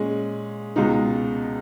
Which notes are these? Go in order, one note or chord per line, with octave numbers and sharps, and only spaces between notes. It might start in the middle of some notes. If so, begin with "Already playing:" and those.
Already playing: A#2 G#3 C#4 G#4
C#2 B2 G#3 D#4